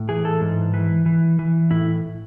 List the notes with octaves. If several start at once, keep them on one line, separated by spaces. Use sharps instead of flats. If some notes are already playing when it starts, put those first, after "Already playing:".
Already playing: A2
E3 G#4
A4
G#2
E3
E3
E3
A2 E4